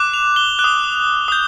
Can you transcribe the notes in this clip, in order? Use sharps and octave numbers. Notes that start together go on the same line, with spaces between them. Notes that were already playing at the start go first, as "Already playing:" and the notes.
Already playing: D6 F#6
F7
G7
F#6
D#6
D#6 G6